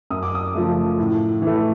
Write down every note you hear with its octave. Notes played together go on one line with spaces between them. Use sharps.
F#2 D#6
D6
D#6
C#3 F3 A3
A2
E3 A3